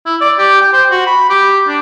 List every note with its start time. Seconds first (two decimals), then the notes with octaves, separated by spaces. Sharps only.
0.06 E4
0.21 D5
0.38 G4
0.61 G5
0.73 C5
0.91 F#4
1.06 B5
1.30 G4
1.68 D4